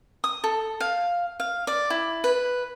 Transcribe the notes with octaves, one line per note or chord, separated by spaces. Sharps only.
D#6
A4
F5
F5
D5
E4
B4